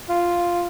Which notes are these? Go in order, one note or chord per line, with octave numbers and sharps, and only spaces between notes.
F4